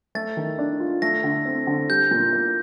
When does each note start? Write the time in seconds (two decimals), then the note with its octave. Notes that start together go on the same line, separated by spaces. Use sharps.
0.15 A3 A6
0.37 D#3
0.59 D4
0.80 F4
1.02 A3 A#6
1.24 D3
1.45 C4
1.67 D3
1.89 G3 G6
2.11 A#2
2.33 A#3